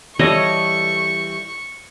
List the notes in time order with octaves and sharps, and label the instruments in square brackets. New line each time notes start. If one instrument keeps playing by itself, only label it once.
[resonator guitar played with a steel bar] E3 G3 A4 [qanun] C#5 D#5 [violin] C#6